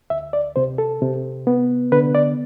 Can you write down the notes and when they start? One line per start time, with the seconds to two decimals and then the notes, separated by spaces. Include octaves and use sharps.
0.10 D2 E5
0.33 D5
0.56 C3 C5
0.78 A4
1.02 C3
1.47 B3
1.92 D3 B4
2.15 D5